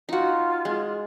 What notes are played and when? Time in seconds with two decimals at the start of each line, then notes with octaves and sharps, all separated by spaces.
0.09 D#4 F4 F#4
0.65 G#3